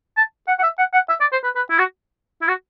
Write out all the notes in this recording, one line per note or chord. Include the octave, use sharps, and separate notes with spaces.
A5
F#5
F#5
E5
F#5
F#5
E5
D5
C5
B4
B4
E4
F#4
E4
F#4